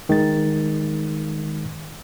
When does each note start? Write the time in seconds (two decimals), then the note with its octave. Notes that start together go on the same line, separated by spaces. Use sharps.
0.09 D#3 G#3 A6